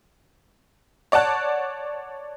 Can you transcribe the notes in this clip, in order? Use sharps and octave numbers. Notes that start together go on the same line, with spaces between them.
C#5 D5 F#5 A5 F#6